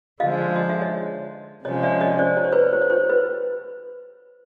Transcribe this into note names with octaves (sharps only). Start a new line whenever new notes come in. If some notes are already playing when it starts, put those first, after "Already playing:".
D3 F3 G#3 D#5 F5
D#5
E5
C#5 D#5
C3 F3 G#3 C#4 C#5 D#5
D5 E5
C#5 D#5
C5 D5
C#5
C5
B4 C#5
C5
C#5
C5
B4